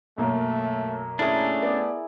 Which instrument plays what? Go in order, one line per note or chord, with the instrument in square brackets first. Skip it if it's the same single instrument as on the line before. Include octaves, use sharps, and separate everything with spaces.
[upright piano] B1 F#2 A#3 [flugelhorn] A3
[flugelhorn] A3 [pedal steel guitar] C#4 D4 [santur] E4 G#4 A#4
[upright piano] B3 D5